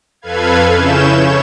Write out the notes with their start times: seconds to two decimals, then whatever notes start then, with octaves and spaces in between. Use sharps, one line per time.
0.22 F2 A4 B4 F5 G#6
0.72 C#3 C#4 E4 G6 E7
1.10 C#5